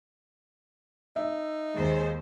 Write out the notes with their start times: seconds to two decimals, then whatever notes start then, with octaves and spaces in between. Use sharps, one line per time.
1.16 D#4 E5
1.74 D#2 G#3 C5